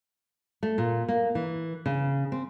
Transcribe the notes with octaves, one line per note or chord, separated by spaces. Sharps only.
A3
A#2
A#3
E3
C#3
C4